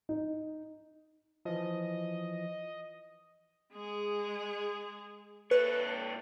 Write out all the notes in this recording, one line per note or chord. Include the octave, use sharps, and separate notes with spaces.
D#4
E3 F3 D#5
G#3 G#4
A#2 A4 B4 C#5